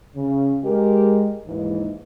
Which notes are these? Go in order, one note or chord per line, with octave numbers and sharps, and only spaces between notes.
C#3
G#3 G4 A#4
D#2 G#2 E3